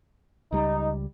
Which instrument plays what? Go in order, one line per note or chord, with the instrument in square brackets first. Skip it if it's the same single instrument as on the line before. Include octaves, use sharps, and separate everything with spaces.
[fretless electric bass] C#2 G3 [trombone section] D#4